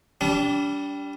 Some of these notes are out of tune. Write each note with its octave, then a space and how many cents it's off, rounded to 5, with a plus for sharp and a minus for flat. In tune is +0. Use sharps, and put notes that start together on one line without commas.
G3 +0 D4 -35